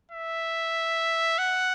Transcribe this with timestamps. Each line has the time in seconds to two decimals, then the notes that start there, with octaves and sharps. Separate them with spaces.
0.11 E5
1.38 F#5